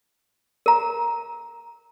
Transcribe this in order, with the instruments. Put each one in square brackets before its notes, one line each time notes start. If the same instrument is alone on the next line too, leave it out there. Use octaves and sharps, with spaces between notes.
[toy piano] A#4 A#5